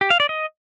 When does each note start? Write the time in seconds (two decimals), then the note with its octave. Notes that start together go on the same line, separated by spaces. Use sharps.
0.01 G4
0.10 F5
0.20 D5
0.29 D#5